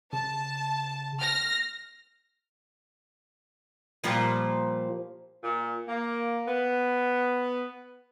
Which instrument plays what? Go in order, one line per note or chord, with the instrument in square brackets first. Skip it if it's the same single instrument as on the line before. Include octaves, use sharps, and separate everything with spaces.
[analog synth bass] C#3 [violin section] A5
[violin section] F6 A#6
[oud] A#2 F3 G3
[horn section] A#2
A#3
B3